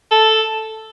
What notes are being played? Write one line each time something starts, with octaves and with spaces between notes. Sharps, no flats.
A4